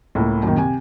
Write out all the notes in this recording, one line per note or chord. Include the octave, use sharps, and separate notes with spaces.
C#2 A2 A#3
F#2 A#2 D#3
C3 G#5